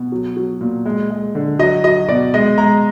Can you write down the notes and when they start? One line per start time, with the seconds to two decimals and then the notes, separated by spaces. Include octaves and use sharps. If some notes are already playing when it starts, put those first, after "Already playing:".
Already playing: B2
0.12 F#3
0.37 F#3
0.61 A#2
0.85 G#3
1.10 G#3
1.35 D3
1.59 F#3 D#5
1.84 F#3 D#5
2.08 B2 D5
2.34 G#3 D#5
2.58 G#3 A#5